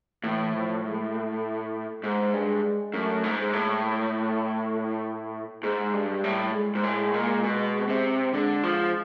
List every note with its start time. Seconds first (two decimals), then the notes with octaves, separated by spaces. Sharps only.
0.24 A2 E3
0.53 F3
0.84 G#3
1.14 A3
2.03 G#2 G#3
2.34 G2
2.93 F#2 A3
3.24 G#2
3.39 G#3
3.53 A2
3.84 A3
5.63 G#2 G#3
5.93 G2
6.08 G3
6.24 A2
6.54 G#3
6.75 G#2
6.84 A2
7.14 A#2
7.43 B2
7.89 C3
8.33 D3 G#3
8.64 F3